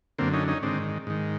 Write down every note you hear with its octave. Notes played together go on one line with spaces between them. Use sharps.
F#2 D3 A#3 C4
C#4 D#4
C#4 D#4
G#2 D#3 C4 D4
G#2 D#3